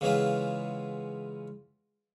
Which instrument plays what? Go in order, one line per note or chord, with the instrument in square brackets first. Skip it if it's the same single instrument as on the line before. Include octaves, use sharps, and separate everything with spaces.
[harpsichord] C#3 E3 G#3 B3 F4